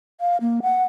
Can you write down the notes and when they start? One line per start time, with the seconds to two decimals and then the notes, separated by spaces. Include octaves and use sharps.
0.20 F5
0.41 A#3
0.62 F#5